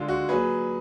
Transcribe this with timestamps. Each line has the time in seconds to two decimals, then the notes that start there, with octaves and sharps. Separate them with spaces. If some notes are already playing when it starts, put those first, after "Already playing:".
Already playing: D3 G#3 F4
0.08 F#4
0.29 A#2 F#3 G#4 B4